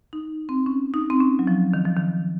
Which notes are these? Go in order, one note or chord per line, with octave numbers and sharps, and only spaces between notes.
D#4
C4
C#4
D#4
C4
C#4
F#3
F3
D#3
F3
D#3